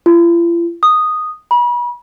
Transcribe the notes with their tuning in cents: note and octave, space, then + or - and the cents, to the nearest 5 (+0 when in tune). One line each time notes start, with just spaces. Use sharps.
F4 -45
D#6 -5
B5 -35